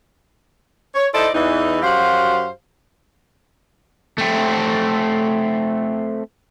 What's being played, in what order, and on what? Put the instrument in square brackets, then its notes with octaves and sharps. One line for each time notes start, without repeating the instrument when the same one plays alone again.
[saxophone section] C#5
D#4 E4 A4 C5 D5 D#5
E2 E3 D#4
F#2 F#4 G4 C5 F5
[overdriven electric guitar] A3 C4